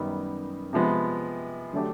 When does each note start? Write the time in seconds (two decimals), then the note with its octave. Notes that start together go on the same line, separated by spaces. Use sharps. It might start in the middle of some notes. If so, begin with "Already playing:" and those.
Already playing: F#2 D#3 G3 B3 D#4
0.73 C3 F3 G#3 B3
1.73 D3 F#3 A3 D4 G4